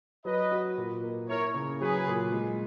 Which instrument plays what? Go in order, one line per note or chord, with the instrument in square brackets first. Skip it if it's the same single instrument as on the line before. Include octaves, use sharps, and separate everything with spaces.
[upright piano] F#3 [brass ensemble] B4 D#5
[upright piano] F#4
A#2
A#3
[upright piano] E4 [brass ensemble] A#4 C#5
[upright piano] C#3
[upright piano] F#3 [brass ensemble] G#4 B4
[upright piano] A#2
G#3